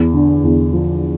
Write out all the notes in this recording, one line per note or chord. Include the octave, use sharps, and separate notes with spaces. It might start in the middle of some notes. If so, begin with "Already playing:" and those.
Already playing: E2
D3
E2
F3